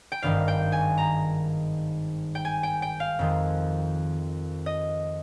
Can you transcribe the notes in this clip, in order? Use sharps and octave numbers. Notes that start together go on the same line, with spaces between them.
G5
G#1 G2 D#3 G3 F5
G5
G#5
A#5
G5
G#5
G5
G5
F5
F2 D#3 G#3
D#5